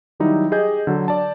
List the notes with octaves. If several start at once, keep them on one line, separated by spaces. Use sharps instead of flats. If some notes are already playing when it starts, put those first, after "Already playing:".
D#3 F#3 G3 D#4 E4
G4 G#4 D#5 G6
D3 F#3
D5 A5